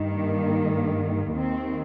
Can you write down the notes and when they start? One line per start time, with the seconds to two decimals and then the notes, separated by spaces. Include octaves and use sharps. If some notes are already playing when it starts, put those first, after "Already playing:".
Already playing: G2 D#3
0.09 A#3
1.35 D#2 D#3 C4